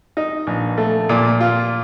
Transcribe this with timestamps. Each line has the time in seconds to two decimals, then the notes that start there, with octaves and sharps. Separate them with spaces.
0.17 D#4
0.47 A#1
0.78 A3
1.09 A#2
1.40 F4